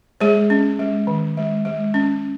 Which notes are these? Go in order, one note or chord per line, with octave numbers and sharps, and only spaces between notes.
G#3 G#4 C#5
C#4
G#3
D#3
G#3
G#3
C#4